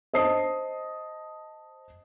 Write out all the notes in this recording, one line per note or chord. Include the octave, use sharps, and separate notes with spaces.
C5 D#5 A5 D#6 C7